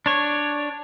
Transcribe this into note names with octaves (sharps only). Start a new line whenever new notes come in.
D4 C#5